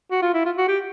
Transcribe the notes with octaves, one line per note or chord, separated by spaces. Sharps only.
F#4
F4
E4
F4
F#4
G4